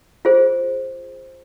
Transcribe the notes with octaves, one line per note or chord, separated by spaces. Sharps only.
F4 G#4 C5